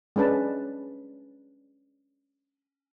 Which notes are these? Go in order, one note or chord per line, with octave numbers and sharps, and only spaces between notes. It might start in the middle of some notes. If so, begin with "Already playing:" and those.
G#3 C#4 D4 B4 A5